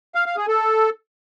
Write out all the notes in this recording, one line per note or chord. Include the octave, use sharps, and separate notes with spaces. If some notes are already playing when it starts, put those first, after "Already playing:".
F5
F5
G#4
A4